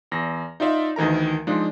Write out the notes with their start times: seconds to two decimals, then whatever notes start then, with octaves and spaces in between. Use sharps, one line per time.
0.12 E2 A#6
0.60 D#4 F4 D5 E5 F5
0.96 D2 D#3 E3 A#4 A#5
1.47 F3 G#3 D4 D#4 F4